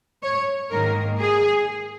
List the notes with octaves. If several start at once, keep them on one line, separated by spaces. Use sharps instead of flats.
C#5
G#2 D#3 A#3 A#4
G#4